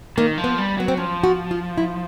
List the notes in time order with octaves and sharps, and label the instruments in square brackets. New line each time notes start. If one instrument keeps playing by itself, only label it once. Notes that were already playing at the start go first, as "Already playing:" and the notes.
[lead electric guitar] D#3 [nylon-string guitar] A#3
[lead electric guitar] F3
[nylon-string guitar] B3
[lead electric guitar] G3
[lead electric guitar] F#3 [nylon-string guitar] B3
[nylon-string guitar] C4
[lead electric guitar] F3 [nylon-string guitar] C#4
[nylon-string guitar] F#4
F4
E4